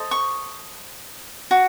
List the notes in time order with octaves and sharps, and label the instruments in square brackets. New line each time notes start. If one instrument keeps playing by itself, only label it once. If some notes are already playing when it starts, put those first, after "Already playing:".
Already playing: [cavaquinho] A4 C5 D#5
C#6
F#4